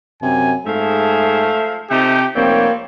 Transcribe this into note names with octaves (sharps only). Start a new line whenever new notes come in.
F#2 C3 G#5
G#2 F3 A3 G#4 E5 F5
C3 F3 A3 D#4 G4
F1 G3 A#3 C4 C#5